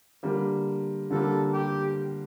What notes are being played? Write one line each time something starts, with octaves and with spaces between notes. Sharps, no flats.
D3 G3 A#3
D3 G3 A#3 A4
G4